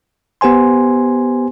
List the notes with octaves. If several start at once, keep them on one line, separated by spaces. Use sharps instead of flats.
B3 G4 C5 G#5 C6